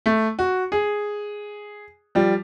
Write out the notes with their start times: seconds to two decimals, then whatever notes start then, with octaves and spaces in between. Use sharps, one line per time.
0.06 A3
0.39 F#4
0.72 G#4
2.15 F3 G3